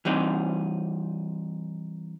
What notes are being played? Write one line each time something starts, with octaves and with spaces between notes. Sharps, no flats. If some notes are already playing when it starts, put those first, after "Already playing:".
E3 G3 C4 D#4